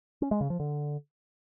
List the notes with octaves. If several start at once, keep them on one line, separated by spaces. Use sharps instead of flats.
C#4
G#3
C#3
F3
D3